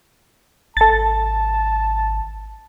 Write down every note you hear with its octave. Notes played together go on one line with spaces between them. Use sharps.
G#1 A4 A5 A6